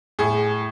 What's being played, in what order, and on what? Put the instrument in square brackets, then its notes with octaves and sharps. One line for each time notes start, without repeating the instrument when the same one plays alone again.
[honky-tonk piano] A2 G#4